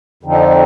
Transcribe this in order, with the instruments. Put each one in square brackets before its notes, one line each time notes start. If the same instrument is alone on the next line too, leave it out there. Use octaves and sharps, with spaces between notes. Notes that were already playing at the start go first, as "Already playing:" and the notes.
[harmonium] F2 D3 F3 C4 D#4